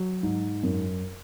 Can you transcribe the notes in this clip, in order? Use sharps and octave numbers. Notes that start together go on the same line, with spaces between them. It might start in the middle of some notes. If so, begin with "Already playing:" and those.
Already playing: F#3
G#2
F#2